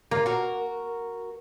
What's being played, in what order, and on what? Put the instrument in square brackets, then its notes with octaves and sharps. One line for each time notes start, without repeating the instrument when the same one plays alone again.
[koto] A#3 [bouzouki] F4
[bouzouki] F#4 A#4